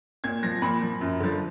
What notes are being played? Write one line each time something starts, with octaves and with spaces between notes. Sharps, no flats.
A#2 G#6
F3 A#6
A#2 B5
F3
F#2
D3 F3